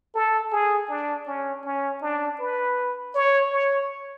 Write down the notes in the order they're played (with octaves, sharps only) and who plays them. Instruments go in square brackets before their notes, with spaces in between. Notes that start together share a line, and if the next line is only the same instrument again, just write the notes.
[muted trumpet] A4
G#4
D4
C#4
C#4
D4
B4
C#5
C#5